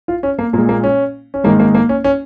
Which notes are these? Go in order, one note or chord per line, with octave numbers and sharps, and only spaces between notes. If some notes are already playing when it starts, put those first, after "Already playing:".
F4
C#4
A#3
A#2 G#3 A#3
A#3
C#4
C#4
G#2 D#3 G#3 A#3
A#3
A#3
C#4
C#4